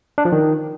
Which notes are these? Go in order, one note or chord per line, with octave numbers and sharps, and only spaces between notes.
D4
F3
D#3